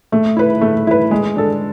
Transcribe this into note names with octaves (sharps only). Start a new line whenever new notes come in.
A3
E4 B4
A3
E4 B4
G#3
D4 A4